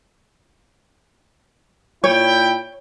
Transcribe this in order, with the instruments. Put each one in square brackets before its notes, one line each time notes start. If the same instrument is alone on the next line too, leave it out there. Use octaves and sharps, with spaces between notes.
[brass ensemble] A#2 E4 G5 [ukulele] C#5